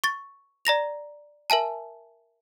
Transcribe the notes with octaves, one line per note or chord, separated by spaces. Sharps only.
C#6 A6
D5 A#5 A#6 F7
A#4 E5 G#5 A5